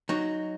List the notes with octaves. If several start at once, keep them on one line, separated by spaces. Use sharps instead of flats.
F#3 D#4